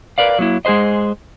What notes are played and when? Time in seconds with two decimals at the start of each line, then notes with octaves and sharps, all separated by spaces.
0.18 A#4 B4 D5 F5
0.39 F#3 A#3 E4
0.65 G#3 G#4 B4 C5 D#5